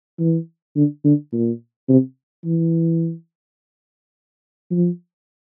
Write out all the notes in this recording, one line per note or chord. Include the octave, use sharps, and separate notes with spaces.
E3
D3
D3
A#2
C3
E3
F3